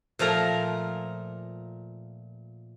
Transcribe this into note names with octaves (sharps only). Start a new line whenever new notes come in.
A#2 F3 A3 A#4 A#5